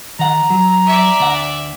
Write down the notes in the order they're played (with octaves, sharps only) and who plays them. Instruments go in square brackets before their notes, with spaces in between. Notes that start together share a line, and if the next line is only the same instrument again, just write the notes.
[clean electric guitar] D#3 F#5 [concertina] A#5
[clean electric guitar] F#3
[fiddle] D5 E5
[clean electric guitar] D2 F#5